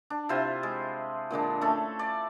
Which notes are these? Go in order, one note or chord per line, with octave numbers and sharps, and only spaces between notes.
D4
C3 E4 F4 C5
G#3
A#2 D3 G#3 D4
A3 C#4 A4
D5